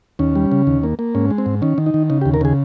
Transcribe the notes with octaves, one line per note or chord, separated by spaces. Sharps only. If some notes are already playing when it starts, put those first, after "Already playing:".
D#2 C#4
G3
C#3
D#2
A#3
A#3
G#2 C#4
G#3
C4
G#2
D#3 C#4
D#3
D#4
D#3
C#3 D#4
G4
D#2
A#4
C#3 G#4